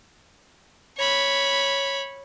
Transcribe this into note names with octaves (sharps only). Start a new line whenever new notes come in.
C#5 B5